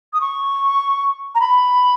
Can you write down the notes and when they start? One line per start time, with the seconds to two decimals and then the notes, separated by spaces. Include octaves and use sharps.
0.13 D#6
0.21 C#6
1.35 A#5
1.40 B5